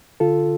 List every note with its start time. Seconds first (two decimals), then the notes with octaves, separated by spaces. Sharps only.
0.20 D3 F4 A4